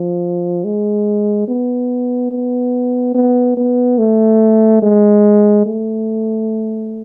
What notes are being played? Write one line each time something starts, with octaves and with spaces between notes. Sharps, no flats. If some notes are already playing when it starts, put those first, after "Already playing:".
Already playing: F3
G#3
B3
B3
B3
B3
A3
G#3
A3